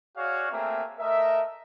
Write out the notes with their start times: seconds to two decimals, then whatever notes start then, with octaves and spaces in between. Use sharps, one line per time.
0.17 F#4 G#4 C#5 D5 F5
0.51 A3 A#3 C4 G#4 A#4 E5
0.99 A3 A#4 D#5 E5